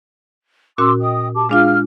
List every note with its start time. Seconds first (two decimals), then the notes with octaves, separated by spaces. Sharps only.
0.78 A#2 C#4 F#4 C6 D6 E6
1.00 D#5 G5 D#6
1.35 G4 A5 D6
1.49 G#3 D4 F4 G#4 F5 F6